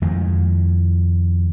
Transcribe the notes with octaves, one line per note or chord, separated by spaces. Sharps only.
F2 D#3 G#3